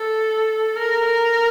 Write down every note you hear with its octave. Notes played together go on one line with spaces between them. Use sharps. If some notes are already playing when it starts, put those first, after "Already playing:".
Already playing: A4
A#4
A#4